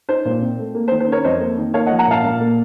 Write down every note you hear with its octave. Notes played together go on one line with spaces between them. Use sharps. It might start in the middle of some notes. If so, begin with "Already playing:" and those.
D#4 C5
A#2
C4
A3
A#3
C5
D#3
C5
C#4 A#4 C#5
F2 C5 D#5
A#3
D#3
A#3 C#5 F5
D#5 F#5
F3
F#5 A#5
A#2 F5 A5
A#2
A#3